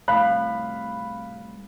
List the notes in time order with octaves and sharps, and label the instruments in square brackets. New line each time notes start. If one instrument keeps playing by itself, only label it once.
[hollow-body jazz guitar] C2 A2 [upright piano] F5 B5 F#6